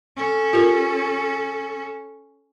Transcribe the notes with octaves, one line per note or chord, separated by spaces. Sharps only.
C#4 A4
F4 G4 A#4